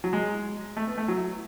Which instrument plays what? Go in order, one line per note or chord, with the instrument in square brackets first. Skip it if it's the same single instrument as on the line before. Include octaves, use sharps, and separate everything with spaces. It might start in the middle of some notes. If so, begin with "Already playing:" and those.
[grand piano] F#3
G#3
A3
B3
A3
F#3